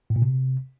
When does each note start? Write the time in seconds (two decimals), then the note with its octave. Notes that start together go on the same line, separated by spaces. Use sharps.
0.10 A2
0.16 A#2
0.22 C3